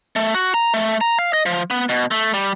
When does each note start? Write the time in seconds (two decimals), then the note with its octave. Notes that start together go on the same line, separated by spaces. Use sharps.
0.16 A3
0.34 F#4
0.54 A#5
0.74 A3
1.01 A#5
1.19 F5
1.33 D#5
1.46 F3
1.71 B3
1.89 B2
2.11 A3
2.34 G3